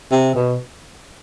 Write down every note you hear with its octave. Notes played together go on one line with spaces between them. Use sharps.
C3
B2